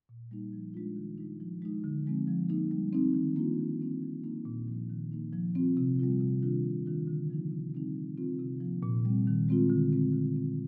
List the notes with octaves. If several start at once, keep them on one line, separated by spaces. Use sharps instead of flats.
A#2
G3 A#3 D#4
F3
G#3 D4 F4
D#3
G#3 D#4
F3
G#3 D#4
D3
F3 G#3 C4
F3
A#3 D#4
G3
C4 D#4
D#3
A#3 D4 F4
D#3
G3 C4 D#4
F3
A#3 D#4
A#2
F3 A#3
D#3
A#3 D#4
F3
C4 F4
C3
G3 C4 F4
C3
D#3 G3 D4 F4
C3
D#3 A#3 D4 F4
D3
F3 A#3 D#4
C3
G3 C4 D#4
G3
C4 F4
C3
F3 A#3
A#2
G3 C4
D#3
G#3 C4 F4
D3
G#3 C4
D3
F3 C4